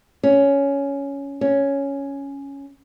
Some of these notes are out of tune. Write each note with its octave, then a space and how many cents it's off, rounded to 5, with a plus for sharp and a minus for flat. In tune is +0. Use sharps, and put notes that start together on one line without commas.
C#4 +10
C#4 +5